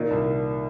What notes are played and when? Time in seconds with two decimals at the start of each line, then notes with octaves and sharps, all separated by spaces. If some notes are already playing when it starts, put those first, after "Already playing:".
Already playing: A#2 D#3
0.11 C2